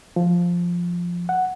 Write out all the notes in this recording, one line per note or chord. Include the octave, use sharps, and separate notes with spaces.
F3
F#5